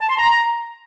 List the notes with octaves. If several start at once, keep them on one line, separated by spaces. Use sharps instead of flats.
A5
C6
A#5